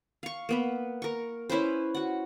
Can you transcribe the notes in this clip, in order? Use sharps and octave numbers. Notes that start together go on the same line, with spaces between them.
F5 C#6
A#3 B3 B4
A#4 C#6
C#4 E4 B4 C5
F#4 F#5